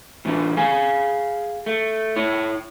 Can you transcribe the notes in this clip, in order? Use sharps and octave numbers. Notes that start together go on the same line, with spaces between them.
A2 E3 D4
G#4 F5 G#5
A3
E4 C#5